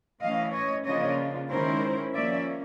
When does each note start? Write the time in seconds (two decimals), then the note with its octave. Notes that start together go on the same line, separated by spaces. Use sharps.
0.21 E3 A3 C#4 D#5 F5
0.53 C#5 D#5
0.85 C#3 F3 A#3 D4 F4 C#5 D#5
1.49 D#3 G#3 C#4 E4 A#4 C5
2.12 F3 A#3 C#4 D5 E5